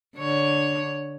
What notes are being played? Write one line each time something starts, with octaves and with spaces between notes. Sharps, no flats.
D3 C#5